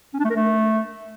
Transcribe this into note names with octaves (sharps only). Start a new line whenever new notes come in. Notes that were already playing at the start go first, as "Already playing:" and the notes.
C#4
D4
A3
A#4
A3